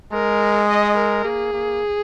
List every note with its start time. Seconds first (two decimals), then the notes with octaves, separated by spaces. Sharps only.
0.13 G#3 A#4
0.68 D#5
0.97 A#4
1.24 A#3 G#4
1.53 A#3